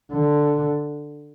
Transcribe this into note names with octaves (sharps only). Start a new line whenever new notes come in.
D3